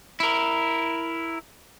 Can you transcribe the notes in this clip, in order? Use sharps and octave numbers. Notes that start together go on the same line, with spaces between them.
E4 A#4